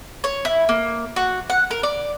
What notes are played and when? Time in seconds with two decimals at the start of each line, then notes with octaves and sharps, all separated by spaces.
0.24 C#5
0.45 E4
0.69 A#3
1.16 F#4
1.50 F#5
1.71 A#4
1.83 D5